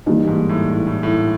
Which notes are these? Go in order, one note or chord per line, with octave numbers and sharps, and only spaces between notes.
G2 E3 G3 A#3 D#4
G#2
A2
A2
A2
A2